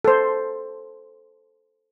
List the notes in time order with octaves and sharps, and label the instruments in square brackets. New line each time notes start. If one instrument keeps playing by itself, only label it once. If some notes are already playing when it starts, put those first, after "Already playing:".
[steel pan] A4 C5